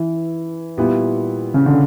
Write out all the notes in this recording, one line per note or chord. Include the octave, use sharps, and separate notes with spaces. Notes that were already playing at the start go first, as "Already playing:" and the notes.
Already playing: E3
A#2 G3 B3 E4 G4
C#3
D3